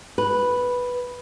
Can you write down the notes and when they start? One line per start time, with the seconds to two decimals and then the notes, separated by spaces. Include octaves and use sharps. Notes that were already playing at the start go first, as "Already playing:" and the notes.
0.18 B4